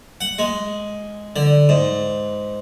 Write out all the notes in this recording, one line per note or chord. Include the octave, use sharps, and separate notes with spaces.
F#5
G#3
D3
G#2